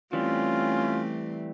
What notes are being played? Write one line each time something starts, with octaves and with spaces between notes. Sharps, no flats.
E3 G3 A3 C4 C#4 F4